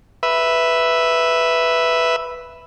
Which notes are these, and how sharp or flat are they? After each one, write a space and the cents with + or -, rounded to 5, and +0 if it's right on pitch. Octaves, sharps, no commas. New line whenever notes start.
B4 +0 E5 +0